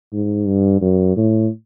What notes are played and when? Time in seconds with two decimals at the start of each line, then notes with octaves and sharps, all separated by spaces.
0.13 G#2
0.47 G2
0.82 F#2
1.17 A2